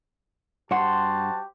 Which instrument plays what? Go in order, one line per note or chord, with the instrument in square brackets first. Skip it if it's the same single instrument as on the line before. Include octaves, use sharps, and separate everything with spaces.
[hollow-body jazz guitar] G2 F#5 [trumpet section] F#4 G4 A5 [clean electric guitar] C5